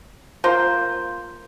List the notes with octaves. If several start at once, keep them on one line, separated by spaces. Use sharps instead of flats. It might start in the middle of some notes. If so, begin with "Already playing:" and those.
A#3 F4 C5